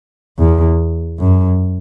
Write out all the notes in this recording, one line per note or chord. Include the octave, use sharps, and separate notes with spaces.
E2
F#2